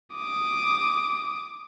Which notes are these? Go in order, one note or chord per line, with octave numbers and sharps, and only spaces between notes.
D6 D#6